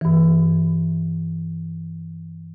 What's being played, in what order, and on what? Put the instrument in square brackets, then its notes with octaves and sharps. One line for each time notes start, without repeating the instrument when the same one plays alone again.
[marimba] G2 E3